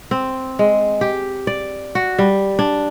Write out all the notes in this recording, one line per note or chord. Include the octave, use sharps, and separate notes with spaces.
C4
G#3
G4
D5
F#4
G3
D4